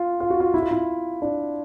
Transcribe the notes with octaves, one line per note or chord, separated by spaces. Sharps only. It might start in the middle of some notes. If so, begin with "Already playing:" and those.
Already playing: F4
F4
F#4
F4
E4
F4
E4
D4